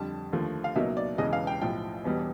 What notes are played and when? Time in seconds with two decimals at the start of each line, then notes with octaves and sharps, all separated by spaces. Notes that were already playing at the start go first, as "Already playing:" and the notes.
Already playing: F2 D3 G3 A5
0.33 D#2 D3 F3 A3
0.64 F5
0.75 C#2 B2 F#3 A#3 D#4 E5
0.97 D5
1.18 E1 E2 C#3 E3 G#3 D#5
1.33 F5
1.47 G5
1.61 B1 A2 F3 G5
2.04 E1 E2 B2 G3